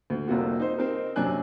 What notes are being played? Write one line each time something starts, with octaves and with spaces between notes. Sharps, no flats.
D2
F1 C2 C3 A#3 F4 F#4
D#4 C5
C4 D#4 A#4
F#2 C3 F#3 D4 G#5 F#6